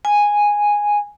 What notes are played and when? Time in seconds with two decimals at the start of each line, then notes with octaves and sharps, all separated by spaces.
0.05 G#5